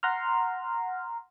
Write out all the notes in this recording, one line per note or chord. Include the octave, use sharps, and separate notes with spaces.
F#5 A#5 C6 F6